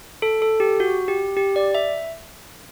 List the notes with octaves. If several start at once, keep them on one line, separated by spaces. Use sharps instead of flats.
A4
A4
G4
F#4
G4
G4
D5
E5